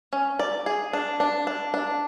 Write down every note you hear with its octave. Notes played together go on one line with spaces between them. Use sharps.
C#4
D5
G#4
D4
D4
D4
D4